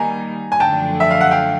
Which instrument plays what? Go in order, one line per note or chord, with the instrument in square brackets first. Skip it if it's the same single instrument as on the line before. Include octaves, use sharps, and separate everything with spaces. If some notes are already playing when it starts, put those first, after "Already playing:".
Already playing: [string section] D#3 G3 A#3 [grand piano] G#5 A#5
[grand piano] G#5
[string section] F#2 D3 F3 A3 D4 [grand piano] G5 A5
[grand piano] E5
F5
F#5
F5 G5